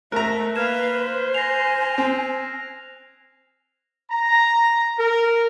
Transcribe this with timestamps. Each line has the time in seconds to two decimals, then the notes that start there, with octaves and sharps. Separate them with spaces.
0.12 A3 A#4 E5 A#5 F#6
0.56 A#3 B4 F5 F6 G#6 E7
0.95 C5
1.35 G#5 A#6 C7 F7
1.98 C4
4.11 A#5
4.98 A#4